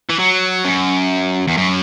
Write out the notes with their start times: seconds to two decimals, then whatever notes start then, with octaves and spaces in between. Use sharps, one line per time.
0.09 E3
0.19 F#3
0.65 F#2
1.48 E2
1.57 F#2